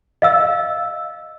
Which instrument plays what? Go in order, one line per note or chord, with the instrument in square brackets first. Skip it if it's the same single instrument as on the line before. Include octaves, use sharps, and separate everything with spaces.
[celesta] D#5 F5 E6